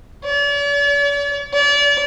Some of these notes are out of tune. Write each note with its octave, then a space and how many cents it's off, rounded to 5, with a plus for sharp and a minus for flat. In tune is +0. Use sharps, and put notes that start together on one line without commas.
D5 -45
D5 -35